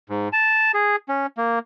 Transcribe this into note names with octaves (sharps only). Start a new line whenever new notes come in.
G#2
A5
G#4
C#4
A#3